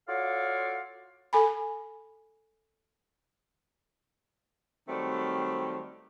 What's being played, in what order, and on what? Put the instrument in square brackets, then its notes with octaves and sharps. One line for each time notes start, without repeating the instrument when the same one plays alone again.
[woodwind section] F4 F#4 A4 C#5 D5 F5
[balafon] A4 G#5 B5
[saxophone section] D#3 F#3 G3 A3 C4